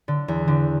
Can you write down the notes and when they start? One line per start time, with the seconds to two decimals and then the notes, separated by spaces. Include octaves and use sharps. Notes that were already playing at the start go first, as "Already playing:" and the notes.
0.08 D3
0.28 E2
0.48 D3